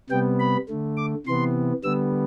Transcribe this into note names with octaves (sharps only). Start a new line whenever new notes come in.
C3 G3 B3 G5
B5
D3 A3
D6
C3 E3 B3 C6
D3 G3 B3 E6